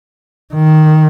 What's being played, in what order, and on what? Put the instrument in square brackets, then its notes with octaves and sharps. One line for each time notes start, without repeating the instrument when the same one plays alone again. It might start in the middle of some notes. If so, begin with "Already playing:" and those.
[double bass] D#3